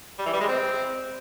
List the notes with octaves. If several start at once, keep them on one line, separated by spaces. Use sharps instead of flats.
G3
E3
G3
G#3
C4